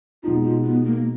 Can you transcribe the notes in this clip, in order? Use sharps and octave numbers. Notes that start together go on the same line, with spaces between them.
B2 G#3 D#4 F4
F4
B3
A#3